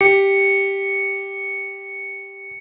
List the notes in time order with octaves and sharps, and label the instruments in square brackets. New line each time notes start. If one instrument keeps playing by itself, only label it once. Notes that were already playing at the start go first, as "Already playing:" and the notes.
[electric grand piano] G4 [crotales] C#7